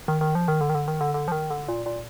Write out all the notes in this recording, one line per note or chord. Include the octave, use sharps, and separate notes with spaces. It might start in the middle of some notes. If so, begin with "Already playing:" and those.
D#3
D#3
F3
D#3
D3
D#3
D3
D#3
D3
D3
F3
D#3
D3
A#2
A#2